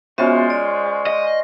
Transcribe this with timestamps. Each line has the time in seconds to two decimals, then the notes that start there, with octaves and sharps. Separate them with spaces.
0.18 G#3 B3 C#4 F4 F#4 C5 E5
0.50 D5
1.07 D#5